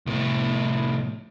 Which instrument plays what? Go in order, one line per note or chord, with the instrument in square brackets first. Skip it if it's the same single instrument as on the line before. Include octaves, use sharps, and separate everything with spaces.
[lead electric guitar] C2 A2